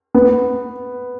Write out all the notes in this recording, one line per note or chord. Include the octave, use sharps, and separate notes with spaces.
B3